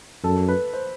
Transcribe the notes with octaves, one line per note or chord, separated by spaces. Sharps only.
F#2 A4
B4
C5